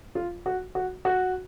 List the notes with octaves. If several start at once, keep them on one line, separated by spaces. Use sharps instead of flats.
F4
F#4
F#4
F#4